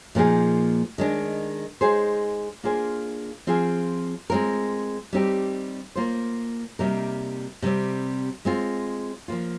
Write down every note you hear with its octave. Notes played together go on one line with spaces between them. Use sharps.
A#2 F3 A#3 D#4 G#4
D#3 G#3 D4
G#3 D#4 G#4 C5
A#3 D4 F4 G#4 C5
F3 C4 F4 G#4
G#3 C4 F4 A#4
G3 C4 D#4 G4
A#3 F4 C5
C3 G3 A#3 D#4 A#4
C3 G3 C4
G#3 C4 F4
F3 A#3 F4